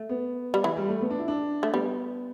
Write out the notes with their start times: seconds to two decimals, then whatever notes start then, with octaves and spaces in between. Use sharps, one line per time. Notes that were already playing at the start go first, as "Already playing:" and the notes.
Already playing: A3
0.09 B3
0.54 G3
0.64 E3
0.77 G3
0.88 A3
1.01 B3
1.10 D4
1.19 E4
1.28 D4
1.63 A3
1.73 G3 B3